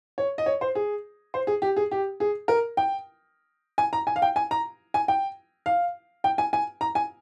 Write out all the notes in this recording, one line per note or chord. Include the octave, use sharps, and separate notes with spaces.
C#5
D#5
C#5
C5
G#4
C5
G#4
G4
G#4
G4
G#4
A#4
G5
G#5
A#5
G#5
F5
G5
G#5
A#5
G#5
G5
F5
G5
G#5
G#5
A#5
G#5